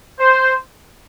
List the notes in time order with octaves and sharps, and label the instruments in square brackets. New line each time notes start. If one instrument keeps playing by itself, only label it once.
[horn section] C5